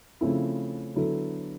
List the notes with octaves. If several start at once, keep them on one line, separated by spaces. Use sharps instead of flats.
C#3 F3 A3 C4 E4
D3 F#3 B3 E4 A4